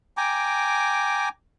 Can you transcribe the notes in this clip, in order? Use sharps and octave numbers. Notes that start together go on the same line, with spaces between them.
G5 G#5 A#5 D6